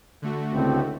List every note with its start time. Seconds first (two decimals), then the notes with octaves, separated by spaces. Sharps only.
0.22 D3 A3 F#4
0.52 C#2 A2 C4